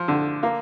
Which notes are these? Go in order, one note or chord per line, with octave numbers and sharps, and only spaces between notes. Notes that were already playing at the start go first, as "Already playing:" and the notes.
Already playing: F3
D3
A#3